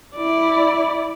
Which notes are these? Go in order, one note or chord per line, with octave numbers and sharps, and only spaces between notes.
E4 D5